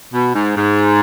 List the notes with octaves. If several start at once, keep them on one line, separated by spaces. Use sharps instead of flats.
B2
G#2
G#2